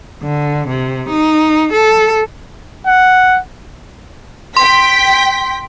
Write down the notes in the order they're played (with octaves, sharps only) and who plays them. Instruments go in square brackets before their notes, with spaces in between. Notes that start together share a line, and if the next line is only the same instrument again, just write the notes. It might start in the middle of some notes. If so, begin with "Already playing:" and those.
[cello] D3
C3
D#4
A4
[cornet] F#5
[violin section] G5 B6 [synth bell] C6